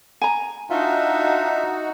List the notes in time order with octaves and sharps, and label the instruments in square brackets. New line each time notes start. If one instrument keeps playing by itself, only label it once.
[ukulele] G#5 A#5
[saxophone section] D4 F4 [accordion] D#4 F#4 [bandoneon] E5